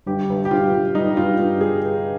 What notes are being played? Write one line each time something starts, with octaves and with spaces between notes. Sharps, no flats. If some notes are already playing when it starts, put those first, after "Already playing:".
G1 G4
G1
G4
G1 F4
G1
G3 D#4
G2 F4
G2
G#4